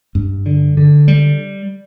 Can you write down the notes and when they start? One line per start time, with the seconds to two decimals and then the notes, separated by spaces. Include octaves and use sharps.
0.15 G2
0.46 D3
0.77 D3
1.08 G3